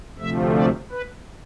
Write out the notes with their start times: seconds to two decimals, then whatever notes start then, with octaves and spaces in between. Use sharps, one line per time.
0.19 D2 C3 F3 A3 E5
0.55 D5
0.91 B4